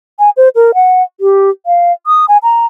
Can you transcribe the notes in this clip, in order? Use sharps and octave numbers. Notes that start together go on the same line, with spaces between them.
G#5
C5
A#4
F#5
G4
F5
D#6
G#5
A#5